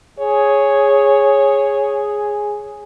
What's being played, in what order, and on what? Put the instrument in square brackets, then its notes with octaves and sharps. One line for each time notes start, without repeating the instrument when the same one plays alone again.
[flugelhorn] G#4 [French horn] C#5